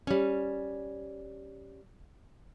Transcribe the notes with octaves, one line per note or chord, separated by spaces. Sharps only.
G3 C#4